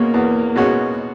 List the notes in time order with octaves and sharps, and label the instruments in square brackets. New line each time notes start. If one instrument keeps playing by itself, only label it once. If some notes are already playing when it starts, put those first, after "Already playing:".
Already playing: [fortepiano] B2 G#3 C#4 [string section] A#3
[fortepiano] E2
B2 G#3 C#4 F#4